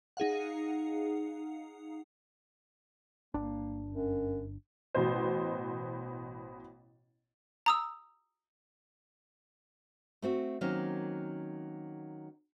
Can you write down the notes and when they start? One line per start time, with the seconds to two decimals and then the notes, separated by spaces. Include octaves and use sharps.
0.17 D#4 G#4 F5 F#5
3.34 G1 A#3 D4
3.90 F#2
4.95 A1 B2 C5
7.66 A#5 D#6 E6
10.22 A3 C4 F#4
10.61 D#3 F#3 A#3 C4 C#4